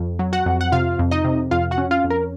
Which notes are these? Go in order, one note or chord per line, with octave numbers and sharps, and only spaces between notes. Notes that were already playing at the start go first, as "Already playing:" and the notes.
Already playing: F2
F#3
F#4 F#5
F2
F#5
C3 F4 F5
F2
D#4 D#5
C3
F2 F4 F5
F#4 F#5
C#4
F4 F5
F2
A#4